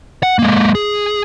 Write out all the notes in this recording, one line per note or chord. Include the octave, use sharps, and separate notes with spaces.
F#5
G#3 A#3
G#4